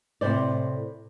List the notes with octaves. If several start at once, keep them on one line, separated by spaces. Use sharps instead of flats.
A2 C3 C5 D5